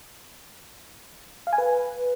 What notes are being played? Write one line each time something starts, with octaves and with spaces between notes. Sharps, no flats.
F5
G#5
B4